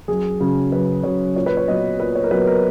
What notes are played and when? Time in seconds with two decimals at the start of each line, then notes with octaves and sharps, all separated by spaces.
0.08 F#2 G#4
0.40 C#3 F#3 C#4
0.72 F#2 B4
1.03 C#3 F#3 C#4 C#5
1.35 A#2 C#5
1.46 B4
1.57 C#5
1.68 F#3 B3 D#5
2.00 A#2 B4
2.15 C#5
2.23 A#4
2.31 F#3 B3 B4
2.47 A#4